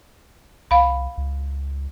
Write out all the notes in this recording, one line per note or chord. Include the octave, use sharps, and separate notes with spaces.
C2 F5 B5
C#2